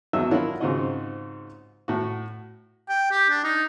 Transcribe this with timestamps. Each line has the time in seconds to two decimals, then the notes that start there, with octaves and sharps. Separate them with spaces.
0.13 G#1 E2 F#3 D#5 E5 E6
0.31 D4 E4 F4 A#4 C#5 F#5
0.61 G#2 C#3 C4 F4 F#4 D#5
1.88 A2 F#4
2.89 G5
3.11 G4
3.29 D4
3.44 D#4